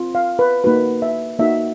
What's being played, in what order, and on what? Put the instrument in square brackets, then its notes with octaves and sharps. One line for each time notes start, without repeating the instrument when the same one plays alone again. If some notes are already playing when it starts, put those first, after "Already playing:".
Already playing: [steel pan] C4 F4
F5
B4
A#3 D#4 F#4 B4
E5
A#3 D#4 F#4 E5